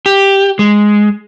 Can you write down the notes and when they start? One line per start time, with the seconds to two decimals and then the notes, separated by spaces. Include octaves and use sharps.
0.06 G4
0.59 G#3